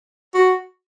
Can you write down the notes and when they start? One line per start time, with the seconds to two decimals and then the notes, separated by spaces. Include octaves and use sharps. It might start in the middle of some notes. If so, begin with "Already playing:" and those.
0.34 F#4